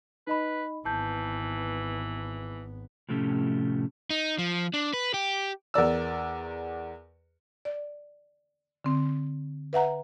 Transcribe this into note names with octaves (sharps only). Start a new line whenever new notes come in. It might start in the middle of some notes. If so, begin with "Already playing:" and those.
D#4 B4 D#5 B5
G#1 E3 B3 A5 G6
A2 C3 F3 A3 C#4 G4
D#4
F3
D4
B4
G4
E2 A#4 D5 E6
D5
D3 C4
B4 E5 F#5 A#5